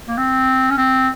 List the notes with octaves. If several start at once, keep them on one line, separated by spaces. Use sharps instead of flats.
A#3
C4
C#4
C4